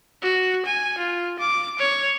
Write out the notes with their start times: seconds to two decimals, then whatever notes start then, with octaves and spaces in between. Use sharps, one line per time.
0.22 F#4
0.66 G#5
0.99 F4
1.40 D6
1.80 C#5